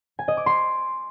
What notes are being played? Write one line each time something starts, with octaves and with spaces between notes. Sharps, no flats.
G#5
D#5
D6
C6